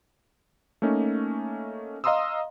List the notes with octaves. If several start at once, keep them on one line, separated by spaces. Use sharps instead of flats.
A3 A#3 C#4 D#4
D#5 F5 A#5 C6 D#6 E6